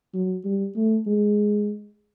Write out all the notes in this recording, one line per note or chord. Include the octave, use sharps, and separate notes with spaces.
F#3
G3
A3
G#3